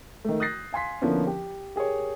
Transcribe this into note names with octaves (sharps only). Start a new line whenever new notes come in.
D#3 A3
D#6 F#6 G6 A6 A#6 C7
F5 G#5 C6 B6
D3 F3 A#3 B3 C#4 E4
G4
G4 G#4 A#4 C#5